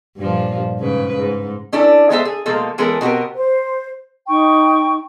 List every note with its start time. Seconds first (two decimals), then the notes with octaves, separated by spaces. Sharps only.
0.17 G2 A#2 F3
0.79 G#2 C#3 B4
1.17 G#2
1.72 C#4 D4 E4 A4
2.10 G#3 B3 G#4 A4 C5 E5
2.25 G#4
2.46 B2 F3 G#3 A#3 A4
2.78 E3 G#3 B3 C#4 A4 A#4
3.01 B2 C4 F#4 G4 A#4
3.36 C5
4.28 D#4 G5 C#6